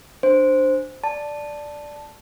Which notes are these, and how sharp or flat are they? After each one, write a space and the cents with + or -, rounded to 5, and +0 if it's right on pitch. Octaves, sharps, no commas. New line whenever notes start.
D4 +15 C5 +0
D5 +0 A5 +0